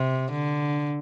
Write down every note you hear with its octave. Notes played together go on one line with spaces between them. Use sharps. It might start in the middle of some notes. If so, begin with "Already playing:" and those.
Already playing: C3
D3